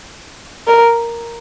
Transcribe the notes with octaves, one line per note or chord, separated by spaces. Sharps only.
A#4